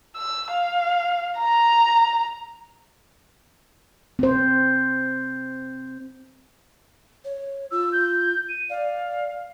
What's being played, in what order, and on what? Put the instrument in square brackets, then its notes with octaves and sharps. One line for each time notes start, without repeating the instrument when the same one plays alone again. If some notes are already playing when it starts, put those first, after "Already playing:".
[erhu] E6
F5
A#5
[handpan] C4 C5
[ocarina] C#5
[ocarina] F4 [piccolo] E6
[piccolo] G6
D#7
[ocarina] D5 [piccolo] F5